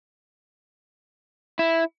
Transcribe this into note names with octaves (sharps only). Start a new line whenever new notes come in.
E4